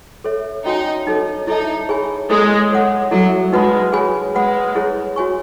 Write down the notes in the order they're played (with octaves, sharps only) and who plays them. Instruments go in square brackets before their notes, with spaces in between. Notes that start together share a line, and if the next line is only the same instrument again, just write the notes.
[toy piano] A4 C#5 E5
[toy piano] C#4 F#4 C#5 G#5 [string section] D#4
[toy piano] D#4 A4 C#5
[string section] D#4 [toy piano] E4 A4 E5 A5
[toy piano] G#4 C#5 G#5 B5
[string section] G#3 [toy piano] E4 A4 C#5
[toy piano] A4 C#5 F#5
[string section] F#3 [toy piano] E4 A4 E5
[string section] G#3 [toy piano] D#4 F#4 B4 F#5 B5
[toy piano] G#4 C#5 G#5 B5
[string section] G#3 [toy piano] B4 F#5 B5
[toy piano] E4 G#4 C#5
F#4 C#5 G#5 C#6